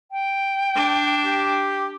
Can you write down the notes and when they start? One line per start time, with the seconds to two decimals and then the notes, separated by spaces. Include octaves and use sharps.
0.12 G5
0.75 D4
1.24 G4